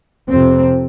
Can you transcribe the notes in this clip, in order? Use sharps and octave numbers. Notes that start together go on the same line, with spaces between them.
F2 C3 C4